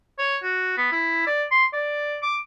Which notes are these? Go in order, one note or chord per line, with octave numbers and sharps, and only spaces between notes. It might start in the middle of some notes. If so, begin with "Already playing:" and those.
C#5
F#4
B3
E4
D5
C6
D5
D6